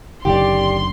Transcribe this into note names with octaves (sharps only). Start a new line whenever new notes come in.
F#1 D2 D#3 G4 D5 C6